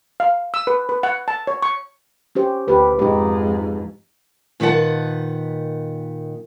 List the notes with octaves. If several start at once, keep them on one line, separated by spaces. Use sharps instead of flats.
F5
E6
B4
B4
F#5
A5
C#5
C#6
C#4 G4 C5
D2 G4 B4
F2 G#2 D#4 G4
A#2 D#3 B4 C5 F#5 A5